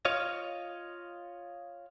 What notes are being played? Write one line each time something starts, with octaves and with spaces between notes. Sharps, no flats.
F4 C#5 D#5 F5